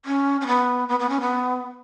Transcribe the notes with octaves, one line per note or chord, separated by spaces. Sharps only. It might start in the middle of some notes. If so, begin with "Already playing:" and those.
C#4
C#4
B3
B3
B3
C#4
B3